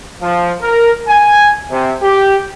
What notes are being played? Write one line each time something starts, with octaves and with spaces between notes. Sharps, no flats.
F3
A#4
G#5
C3
G4